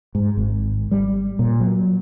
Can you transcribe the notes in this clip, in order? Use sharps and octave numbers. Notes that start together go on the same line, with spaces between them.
G#2
G#1
G3
A#2
F#3